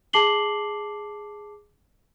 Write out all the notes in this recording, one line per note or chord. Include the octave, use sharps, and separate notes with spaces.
G#4 A5 D6 C7 F#7 G7